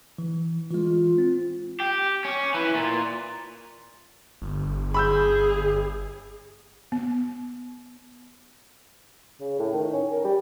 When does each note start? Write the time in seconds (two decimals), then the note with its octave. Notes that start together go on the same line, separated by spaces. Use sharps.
0.18 E3
0.71 E3 G#3 F4
1.18 C4
1.80 G4
2.25 C#4
2.54 E3
2.75 A#2
4.42 G1
4.94 G#4 B5 E6 G6
6.92 B3
9.40 C#3
9.59 A2
9.74 D#3
9.93 C#4
10.11 A#4
10.24 G3